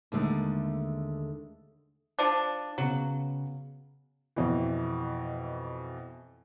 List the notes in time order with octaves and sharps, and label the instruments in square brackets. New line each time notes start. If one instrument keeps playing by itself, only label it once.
[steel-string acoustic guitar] D#2 D3 G#3 A3
[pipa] F3 D4
[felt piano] C#3 B3 [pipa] F#3
[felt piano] F2 B2 E3